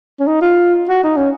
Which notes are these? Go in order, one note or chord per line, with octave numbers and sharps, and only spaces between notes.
C#4
D#4
F4
F#4
D#4
C#4